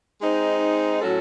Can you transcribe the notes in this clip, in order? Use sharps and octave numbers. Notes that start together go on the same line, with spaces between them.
G#3 C4 D#4
A2 F#3 C#4 F#4 A4